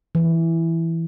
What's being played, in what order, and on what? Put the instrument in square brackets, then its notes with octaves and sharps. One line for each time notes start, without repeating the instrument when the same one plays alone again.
[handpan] E3